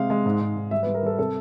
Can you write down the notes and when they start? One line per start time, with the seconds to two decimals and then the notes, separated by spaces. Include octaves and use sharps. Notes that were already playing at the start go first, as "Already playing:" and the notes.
Already playing: C3 G#3 F5
0.10 G#3
0.26 G#2
0.41 G#2
0.56 G#2
0.71 G3 E5
0.83 B4
0.87 G3
0.94 A#4
1.03 G3 A4
1.18 C3 A4